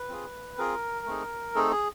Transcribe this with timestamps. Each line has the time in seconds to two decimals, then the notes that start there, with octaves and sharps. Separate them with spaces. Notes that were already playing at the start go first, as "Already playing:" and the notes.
Already playing: B4
0.09 C4 F4 G#4
0.58 C4 F4 G#4 A#4
1.06 A3 C4 D#4 G#4
1.55 A3 C4 D#4 G#4 A4
1.71 G#4